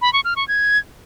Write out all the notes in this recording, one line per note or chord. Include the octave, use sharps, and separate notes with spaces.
B5
C#6
F6
C#6
G#6